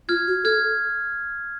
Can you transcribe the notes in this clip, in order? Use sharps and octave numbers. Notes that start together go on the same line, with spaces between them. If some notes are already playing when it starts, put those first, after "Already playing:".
F4 F6 G#6
F#4
A4 F6 G#6